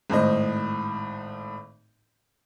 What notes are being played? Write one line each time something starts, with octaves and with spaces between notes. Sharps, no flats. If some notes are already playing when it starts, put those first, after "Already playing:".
G#1 A2 C5 D#5